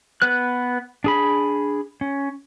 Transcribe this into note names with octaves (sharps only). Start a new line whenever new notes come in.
B3 B4 F#6
D4 G#4 B5
C#4